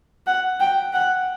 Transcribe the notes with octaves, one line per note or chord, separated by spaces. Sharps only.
F#5
G5
F#5